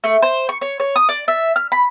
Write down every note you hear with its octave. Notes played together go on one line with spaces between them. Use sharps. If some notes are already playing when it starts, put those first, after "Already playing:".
A3
C5
C#6
C#5
C#5
D#6
D5
E5
F6
B5